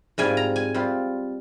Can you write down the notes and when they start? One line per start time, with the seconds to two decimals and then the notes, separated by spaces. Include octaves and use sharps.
0.18 G#2 G3 C4 F4 G#5
0.37 A#5
0.56 G#5
0.74 G3 C4 F4